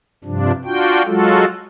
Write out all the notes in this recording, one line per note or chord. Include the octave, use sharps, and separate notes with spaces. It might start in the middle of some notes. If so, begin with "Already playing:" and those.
G2 C3 F3 D4
D4 F4 F#4 G5
F#3 G#3 F4 F#4 A4